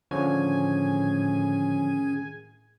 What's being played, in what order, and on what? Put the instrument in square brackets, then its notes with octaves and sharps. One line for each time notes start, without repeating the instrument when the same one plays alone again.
[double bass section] A2 [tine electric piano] D3 F3 C#5 [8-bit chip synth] D#3 C#4 G#4 [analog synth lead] G#5